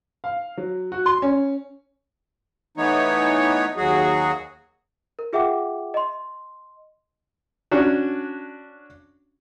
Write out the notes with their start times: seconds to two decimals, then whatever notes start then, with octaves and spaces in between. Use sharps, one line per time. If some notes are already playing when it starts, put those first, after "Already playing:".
0.24 F5
0.57 F#3
0.92 F#4
1.06 C6
1.22 C#4
2.77 E3 A3 B3 D#4 C#5
3.76 D#2 F#3 F#4 G#4
5.19 A#4
5.33 F4 G#4 E5 F#5 G5 D6
5.94 D#5 C6
7.71 C#4 D4 F#4